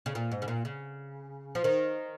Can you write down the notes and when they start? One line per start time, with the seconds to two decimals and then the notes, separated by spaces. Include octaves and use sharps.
0.06 C#3
0.15 A#2
0.32 G#2
0.42 C#3
0.48 A#2
0.65 C#3
1.55 F3
1.64 D#3